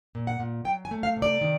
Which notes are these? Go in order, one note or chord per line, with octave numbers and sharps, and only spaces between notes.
A#2
F#5
A#2
F#3 G5
G#5
A3
F5
C3
D5
D#3